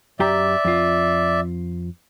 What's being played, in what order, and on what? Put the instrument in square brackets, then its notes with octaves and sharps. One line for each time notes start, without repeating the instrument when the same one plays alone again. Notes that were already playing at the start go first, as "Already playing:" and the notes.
[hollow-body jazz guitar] F#2 G4 A#5 [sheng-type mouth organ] D5 E5
[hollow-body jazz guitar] F2 F4